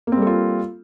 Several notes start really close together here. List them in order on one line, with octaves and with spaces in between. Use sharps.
A#3 C4 G3 A4 F4